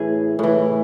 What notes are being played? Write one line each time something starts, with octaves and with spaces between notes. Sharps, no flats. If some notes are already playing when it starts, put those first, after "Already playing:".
Already playing: A2 E3 G#4
A2 E3